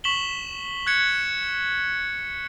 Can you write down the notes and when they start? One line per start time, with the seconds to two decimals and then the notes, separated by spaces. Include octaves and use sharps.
0.04 C#6 B6 E7 F#7 G7
0.87 F#6 G#6 C#7